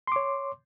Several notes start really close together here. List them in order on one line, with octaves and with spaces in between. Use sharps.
C6 D6 C#5